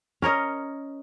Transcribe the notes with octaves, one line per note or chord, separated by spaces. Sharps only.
C#4 A#4 C#5 D#5